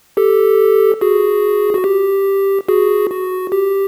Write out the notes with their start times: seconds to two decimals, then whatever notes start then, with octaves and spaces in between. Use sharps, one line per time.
0.17 G4 A4
1.01 F#4 G#4
1.74 F#4
1.84 G4
2.68 F#4 G#4
3.10 F#4
3.52 G4